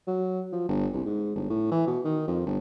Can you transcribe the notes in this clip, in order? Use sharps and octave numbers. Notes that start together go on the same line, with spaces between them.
F#3
F3
G1
C2
G#2
G1
A2
E3
B2
D#3
F2
G1